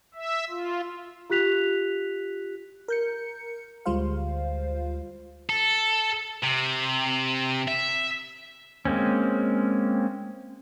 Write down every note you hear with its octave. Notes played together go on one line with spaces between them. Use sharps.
E5
F4
F4 G4 F#6 B6 F7
A#4 G6 C#7
D2 G3 G#3 F4 C5 F5
A4
C3
E5
G#3 A#3 C4 C#4